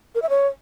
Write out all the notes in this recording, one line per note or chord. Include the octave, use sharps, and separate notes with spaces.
A#4
E5
C#5